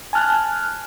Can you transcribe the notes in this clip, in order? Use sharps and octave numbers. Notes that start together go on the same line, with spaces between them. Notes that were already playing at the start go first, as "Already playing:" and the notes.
G#5 A5 F6 F#6